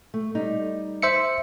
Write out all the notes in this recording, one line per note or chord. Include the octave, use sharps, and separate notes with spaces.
A3
G3 D#4
C5 E5 C#7